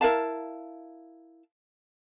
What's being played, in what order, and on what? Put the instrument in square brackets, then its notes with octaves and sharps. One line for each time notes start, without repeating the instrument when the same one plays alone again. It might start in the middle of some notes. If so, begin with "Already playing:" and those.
[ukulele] E4 A#4 F5 A5